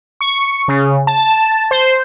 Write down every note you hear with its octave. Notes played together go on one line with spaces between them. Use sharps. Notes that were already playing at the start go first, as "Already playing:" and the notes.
C#6
C#3
A5
C5